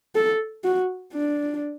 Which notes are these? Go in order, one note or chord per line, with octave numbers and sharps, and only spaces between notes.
A4
F#4
D4